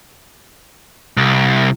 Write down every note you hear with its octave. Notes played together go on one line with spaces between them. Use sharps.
C2